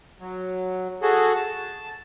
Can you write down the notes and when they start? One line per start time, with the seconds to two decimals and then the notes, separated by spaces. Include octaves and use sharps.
0.21 F#3
1.02 F#4 G#4 A4
1.36 A5